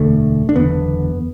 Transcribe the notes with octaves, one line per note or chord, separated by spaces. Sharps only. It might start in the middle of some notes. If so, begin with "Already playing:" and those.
Already playing: E1 D2 D3 A3
D4
F#1 E2 D3 B3